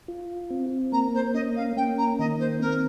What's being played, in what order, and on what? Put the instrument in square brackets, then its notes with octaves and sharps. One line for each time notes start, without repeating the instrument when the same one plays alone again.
[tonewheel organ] F4
C4
[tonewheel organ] A#3 [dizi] A#5
[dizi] C5
[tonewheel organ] C#4 [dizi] D#5
[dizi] F5
[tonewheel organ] A#3 [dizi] G5
[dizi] A#5
[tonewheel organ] D#3 [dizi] D#5
[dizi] C5
[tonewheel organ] C4 [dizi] A#4